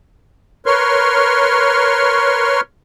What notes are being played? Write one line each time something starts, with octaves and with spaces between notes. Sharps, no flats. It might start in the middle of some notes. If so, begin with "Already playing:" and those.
A#4 B4 C#5 C6 C#6 F6